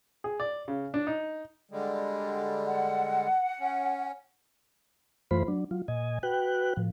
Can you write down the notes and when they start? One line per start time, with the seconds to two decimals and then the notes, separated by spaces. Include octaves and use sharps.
0.24 G#4
0.40 D5
0.68 C#3
0.94 D4
1.07 D#4
1.71 D3 G3 G#3
2.67 F#5
3.60 C#4
5.31 F#2 E3 A3 F4 C5 B5
5.48 F#3 D4
5.71 F#3 F4
5.88 A#2 D#5 G#5
6.23 F#4 B4 G5 F#6
6.77 A2 F3